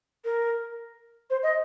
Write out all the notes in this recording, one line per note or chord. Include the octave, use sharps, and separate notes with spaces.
A#4
C5
D#5